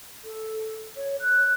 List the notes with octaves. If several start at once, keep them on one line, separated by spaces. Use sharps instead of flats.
A4
C#5
F#6